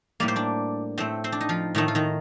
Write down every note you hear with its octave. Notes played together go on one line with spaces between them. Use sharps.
A2 G3 A#3 D5
C5
D4 D5
A2 A3 C4 C5
C4 C5
D4
D#4
F3 F4
A2 D#3 A3 D#4
F4
D#3 D#4